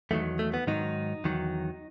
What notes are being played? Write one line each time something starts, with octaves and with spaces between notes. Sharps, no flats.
E2 D#3 F#3 A3
A3
B3
G#2 D#3 F#3 D#4
E2 D#3 F#3